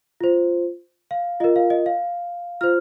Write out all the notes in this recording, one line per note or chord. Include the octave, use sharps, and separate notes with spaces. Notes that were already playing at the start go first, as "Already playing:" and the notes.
F4 C5
F5
F4 A#4 D#5
F5
D#5
F5
F4 C5 F6